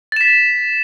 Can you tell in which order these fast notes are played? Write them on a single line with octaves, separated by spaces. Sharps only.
A6 E7 B6